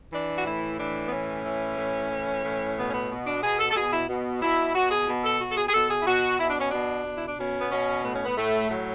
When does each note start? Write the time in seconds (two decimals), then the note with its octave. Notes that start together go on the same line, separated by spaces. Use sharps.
0.12 E3 D4
0.37 F#4
0.46 A2 E4
0.78 E3 D4
1.07 B3
1.12 A2 C#4
1.45 E3
1.78 A2
2.11 E3
2.44 A2
2.77 B2 B3
2.88 C#4
2.93 B3
3.10 B2
3.26 D4
3.43 B2 G#4
3.59 A4
3.71 A4
3.75 B2 G#4
3.92 E4
4.09 B2
4.42 B2 E4
4.74 B2 F#4
4.91 G#4
5.08 B2
5.24 A4
5.40 B2 F#4
5.51 A4
5.57 G#4
5.69 G#4
5.74 B2 A4
5.90 G#4
6.01 E4
6.07 B2 F#4
6.39 B2 E4
6.50 D4
6.60 C#4
6.71 B2 D4
7.06 B2
7.17 E4
7.28 D4
7.38 B2 C#4
7.61 B3
7.71 B2 C#4
8.04 A2 B3
8.15 C#4
8.25 B3
8.37 A2 A3
8.70 A2 F#3